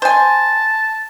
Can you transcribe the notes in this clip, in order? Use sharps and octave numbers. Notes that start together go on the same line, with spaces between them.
C5 G#5 A5